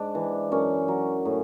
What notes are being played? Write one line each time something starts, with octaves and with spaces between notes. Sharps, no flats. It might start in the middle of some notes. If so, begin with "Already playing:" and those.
Already playing: G#2 D4
E3
F#2 C#4
F#3
A2